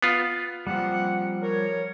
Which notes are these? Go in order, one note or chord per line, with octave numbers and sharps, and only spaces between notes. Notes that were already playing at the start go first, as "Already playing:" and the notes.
B3 F4
F3 G3 A#3 C4 F#5
A#4 C#5